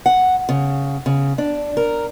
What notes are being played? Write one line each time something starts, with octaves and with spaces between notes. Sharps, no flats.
F#5
C#3
C#3
D4
A#4